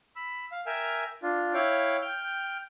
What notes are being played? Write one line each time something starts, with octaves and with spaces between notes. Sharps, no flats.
B5 E6
F5
A#4 E5 G5 G#5 E6 F6
D4 F4
E4 C#5 F5 G5
G5 F6 G6